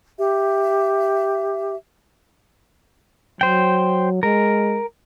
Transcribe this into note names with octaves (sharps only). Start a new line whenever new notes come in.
G4 E5
F#3 C5 G5
G#3 A#4